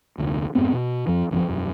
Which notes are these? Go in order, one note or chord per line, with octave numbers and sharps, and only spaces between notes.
F1 D2
F2 G#2 B3 C4
B2
F2 F3
G1 F2 C#3 F3
E1 F#2